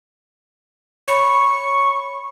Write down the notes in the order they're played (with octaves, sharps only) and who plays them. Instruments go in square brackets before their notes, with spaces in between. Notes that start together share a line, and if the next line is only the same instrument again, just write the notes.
[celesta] C#5 B5 [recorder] C#6